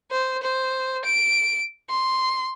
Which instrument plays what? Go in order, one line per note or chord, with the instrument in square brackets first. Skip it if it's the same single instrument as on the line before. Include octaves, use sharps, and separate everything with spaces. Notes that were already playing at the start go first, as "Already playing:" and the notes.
[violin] C5
C5
D7
C6